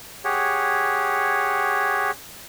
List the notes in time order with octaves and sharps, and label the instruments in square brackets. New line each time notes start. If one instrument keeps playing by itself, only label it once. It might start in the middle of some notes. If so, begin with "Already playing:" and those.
[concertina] G4 G#4 C#5 F#5